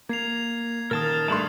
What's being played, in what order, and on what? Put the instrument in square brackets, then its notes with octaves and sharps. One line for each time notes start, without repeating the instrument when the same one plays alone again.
[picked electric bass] A#3 [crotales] G#6 C7 F7
[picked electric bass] A#2 D#3 [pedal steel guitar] A#4 A5 [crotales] D#6 F6 A6
[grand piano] G2 A3 C6 [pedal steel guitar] A5 B5